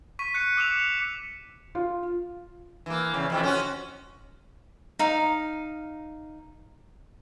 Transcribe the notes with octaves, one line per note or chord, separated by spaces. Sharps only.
C#6 B6 D#7
F#6 C#7 D#7
D6 E6 C#7 E7 F7
E7
F4
E3 A#3
E2 C#3
F2 C3 E3
C#4 F#4
D#4 F5